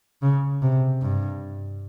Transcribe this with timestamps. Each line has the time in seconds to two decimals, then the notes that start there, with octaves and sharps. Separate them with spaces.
0.22 C#3
0.62 C3
1.02 G2